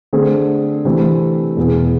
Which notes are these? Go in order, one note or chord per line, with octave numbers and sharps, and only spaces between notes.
D3 A3 C4 G#4
C3 E3 A3 C4
E2 B2 B3 E4 G#4